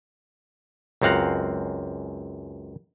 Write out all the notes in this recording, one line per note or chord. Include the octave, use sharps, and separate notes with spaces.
C#2 F#2 C4 F5 F#5 A#5